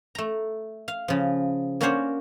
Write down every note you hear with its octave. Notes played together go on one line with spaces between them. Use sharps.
A3 A#5
F5
C#3 F3
A#3 C#4 D4 F#4 C5 C#5